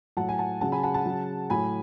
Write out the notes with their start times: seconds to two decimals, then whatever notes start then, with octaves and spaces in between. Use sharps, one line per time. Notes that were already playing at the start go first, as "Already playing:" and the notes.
0.17 A2 F#3 F#5 A5
0.29 G#5
0.39 F#5 A5
0.61 C#3 F#3 F#5 A5
0.72 G#5 B5
0.83 F#5 A5
0.94 F#5 A5
1.06 C#3 F#3
1.50 A2 F#3 G#5 B5